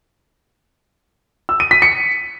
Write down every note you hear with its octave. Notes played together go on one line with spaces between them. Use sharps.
E6
D#7
B6
C#7